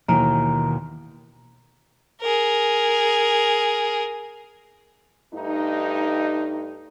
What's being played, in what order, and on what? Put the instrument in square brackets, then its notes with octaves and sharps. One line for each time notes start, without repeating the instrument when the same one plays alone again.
[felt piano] D#2 E3 [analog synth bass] B2 [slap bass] D#3 [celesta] A#5
[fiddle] G#4 A#4
[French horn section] G2 A3 D#4